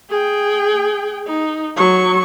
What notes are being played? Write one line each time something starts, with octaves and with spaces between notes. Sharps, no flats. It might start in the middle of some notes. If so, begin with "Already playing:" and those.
G#4 G5
D#4
F#3 C#6